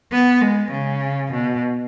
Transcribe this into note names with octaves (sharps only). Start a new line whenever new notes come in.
B3
G#3
C#3
B2